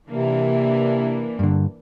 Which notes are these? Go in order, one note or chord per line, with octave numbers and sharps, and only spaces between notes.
C3 E3 A#3 D4
G2 D3